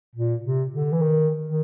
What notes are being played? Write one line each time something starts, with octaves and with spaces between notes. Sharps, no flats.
A#2
C3
D3
E3
D#3
D#3